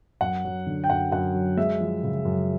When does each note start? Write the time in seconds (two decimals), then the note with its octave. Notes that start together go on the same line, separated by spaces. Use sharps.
0.21 F#2 F#5
0.45 F#3
0.67 D3
0.84 G5
0.90 F#2 F#5
1.12 F#2 F#5
1.35 F#3
1.57 G#3 E5
1.80 F3
2.03 C#3
2.25 F#2